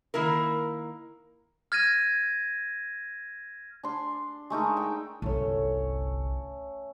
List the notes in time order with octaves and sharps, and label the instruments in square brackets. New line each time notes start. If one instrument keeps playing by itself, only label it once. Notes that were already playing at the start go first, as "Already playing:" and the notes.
[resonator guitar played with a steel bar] D#3 A#3 E4 A#4
[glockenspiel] F6 G#6 A#6 D#7
[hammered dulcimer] D4 C6
G#3 A3 D#4 A#4
G5
[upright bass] G1 C2 [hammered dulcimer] A3 C#4 C#5